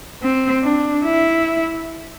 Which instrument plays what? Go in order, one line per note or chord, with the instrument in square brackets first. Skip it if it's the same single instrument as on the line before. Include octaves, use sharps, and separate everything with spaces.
[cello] C4
D4
E4